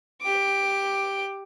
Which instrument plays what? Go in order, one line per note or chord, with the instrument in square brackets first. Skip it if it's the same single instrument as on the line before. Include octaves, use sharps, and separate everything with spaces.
[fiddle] G4 D6